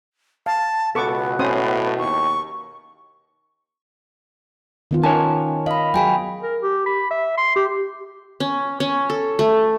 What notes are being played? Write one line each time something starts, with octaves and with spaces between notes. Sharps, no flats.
F5 A5
C#2 B2 B3 A4 C#6 D6
A2 C#4 C5 D#6
D#2 C#6
D#3 B3 F4
C#4 D#4 A#4 C#5 G#5 A5
D#5 F5 B5
F#3 F#4 G#4 G5 G#5 B5
A#4
G4
B5
E5
C6
G4
C#4
C#4
A4
A3